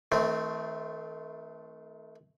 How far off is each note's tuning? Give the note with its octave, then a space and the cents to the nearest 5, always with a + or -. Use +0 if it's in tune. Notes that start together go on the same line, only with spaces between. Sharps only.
D#3 +40 A3 +0 C4 -10